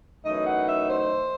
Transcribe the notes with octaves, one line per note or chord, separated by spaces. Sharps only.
F#2 E3 A3 D#4 D#5
F#5
E5
C5